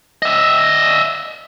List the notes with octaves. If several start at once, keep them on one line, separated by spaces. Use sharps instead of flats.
D#5 E5